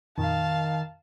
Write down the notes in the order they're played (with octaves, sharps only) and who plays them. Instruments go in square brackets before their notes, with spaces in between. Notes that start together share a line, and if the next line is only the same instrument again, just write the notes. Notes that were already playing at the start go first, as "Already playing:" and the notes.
[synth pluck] F2 A#2 [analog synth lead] D#3 [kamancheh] F5 A5